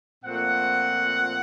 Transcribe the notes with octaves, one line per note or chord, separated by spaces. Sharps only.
A#2 F3 A3 C4 F#5